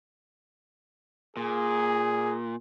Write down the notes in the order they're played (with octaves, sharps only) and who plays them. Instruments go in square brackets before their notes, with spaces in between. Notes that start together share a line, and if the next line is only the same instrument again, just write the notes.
[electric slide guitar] A#2 [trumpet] G#4